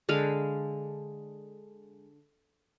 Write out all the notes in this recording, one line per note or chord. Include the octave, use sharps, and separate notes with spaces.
D3 G#3 F5 B5